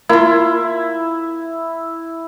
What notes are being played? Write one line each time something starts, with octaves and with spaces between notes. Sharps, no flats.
A#3 E4 F4